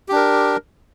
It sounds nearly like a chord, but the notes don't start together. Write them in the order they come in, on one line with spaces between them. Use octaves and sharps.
G4 D4 A#4